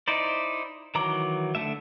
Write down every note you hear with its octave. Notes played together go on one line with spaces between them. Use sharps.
D#4 E4 C5 D5
D#3 E3 F#3 A#5 D6
D3 A3 E5